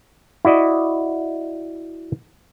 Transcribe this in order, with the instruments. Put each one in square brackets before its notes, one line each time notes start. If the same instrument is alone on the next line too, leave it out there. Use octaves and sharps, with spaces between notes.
[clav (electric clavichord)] E4 F#4 D5 D#5